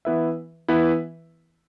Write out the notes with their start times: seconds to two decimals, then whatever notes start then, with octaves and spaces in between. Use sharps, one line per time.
0.05 E3 B3 E4 B4 E5
0.68 E3 B3 E4 B4 E5